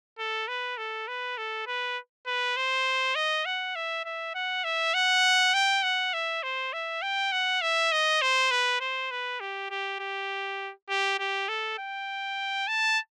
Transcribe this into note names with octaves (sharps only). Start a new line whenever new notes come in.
A4
B4
A4
B4
A4
B4
B4
C5
D#5
F#5
E5
E5
F#5
E5
F#5
G5
F#5
E5
C5
E5
G5
F#5
E5
D#5
C5
B4
C5
B4
G4
G4
G4
G4
G4
A4
G5
A5